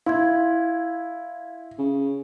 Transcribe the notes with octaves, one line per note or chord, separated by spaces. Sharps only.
E4 F5 C6 G#6
C#3